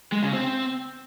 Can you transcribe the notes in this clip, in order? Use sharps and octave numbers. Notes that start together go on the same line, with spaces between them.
G#3
C#3
C4